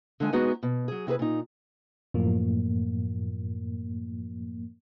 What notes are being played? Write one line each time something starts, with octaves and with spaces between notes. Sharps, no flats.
D3 G#3 G#5
G#3 B3 D#4 F#4 G#4
B2
F#3 G#4
C3 E4 G#4 B4
A#2 D#4
F#2 A2 F3 A#3